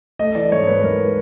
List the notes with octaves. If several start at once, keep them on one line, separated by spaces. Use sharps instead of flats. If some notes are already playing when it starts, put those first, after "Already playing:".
A3 D#5
E3 D5
G#2 C#5
G#2 B4
G#2 A#4
B4